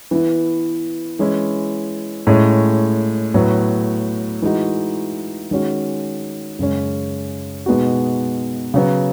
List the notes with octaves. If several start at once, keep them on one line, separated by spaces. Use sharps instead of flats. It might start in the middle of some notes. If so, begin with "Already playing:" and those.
E3 B3 E4
E3 G#3 C#4 E4
A2 G#3 C#4
A2 F#3 B3
E3 G#3 D#4 F#4
D#3 G#3 C#4 F#4
F#2 C#3 G#3 C#4
B2 G#3 B3 D#4 F#4
C#3 F#3 B3